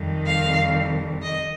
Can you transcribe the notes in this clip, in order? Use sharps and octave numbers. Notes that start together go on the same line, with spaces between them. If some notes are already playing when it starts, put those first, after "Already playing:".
Already playing: F2 C3 D#3 G3
F5
D#5